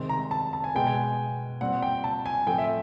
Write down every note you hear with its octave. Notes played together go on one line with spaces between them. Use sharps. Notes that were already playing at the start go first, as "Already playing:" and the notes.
Already playing: C3 D#3 G#3 C4
A#5
A5
A5
G#5
B2 G#3 B3 G5
G#5
A#2 G3 C4 F#5
G5
A5
G#5
A2 F3 A3 C4 G5
E5